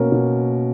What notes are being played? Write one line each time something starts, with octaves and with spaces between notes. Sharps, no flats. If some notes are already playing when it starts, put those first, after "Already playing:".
Already playing: B2 A#3 C#4 A#4
B2